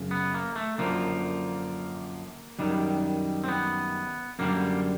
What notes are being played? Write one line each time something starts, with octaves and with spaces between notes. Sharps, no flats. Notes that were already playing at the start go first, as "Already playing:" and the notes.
Already playing: F#2 C#3
B3
A#3
A3
F#2 D3 F3 A#3
F#2 D#3 G3
C4
B3
F#2 D3 G3 A#3